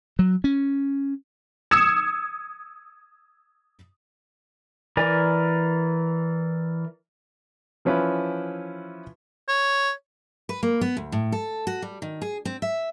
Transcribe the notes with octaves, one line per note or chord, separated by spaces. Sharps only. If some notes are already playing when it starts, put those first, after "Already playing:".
F#3
C#4
D#6 E6 G#6 C#7 E7
E3 A#4 D5 G#5
E3 F3 C#4 E4 B4
C#5
B4
A#3
B3
D2
A2
A4
F#4
G3
D#3
G#4
C4
E5